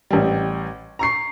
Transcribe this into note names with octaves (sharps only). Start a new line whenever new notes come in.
A1 G3
A#5 C#6 C7